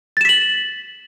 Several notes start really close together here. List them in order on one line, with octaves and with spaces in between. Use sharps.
A6 E7 B6 F#7